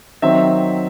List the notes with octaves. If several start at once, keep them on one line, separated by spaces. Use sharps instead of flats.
D#3 F#3 C4 E5